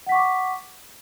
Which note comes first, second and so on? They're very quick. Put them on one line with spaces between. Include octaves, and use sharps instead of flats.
F#5 B6 C#6 D6